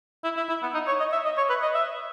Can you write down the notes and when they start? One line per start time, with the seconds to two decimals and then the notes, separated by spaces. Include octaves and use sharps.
0.24 E4
0.37 E4
0.49 E4
0.62 B3
0.74 D#4
0.87 C#5
1.00 D#5
1.12 E5
1.25 D#5
1.37 C#5
1.50 B4
1.62 D#5
1.75 E5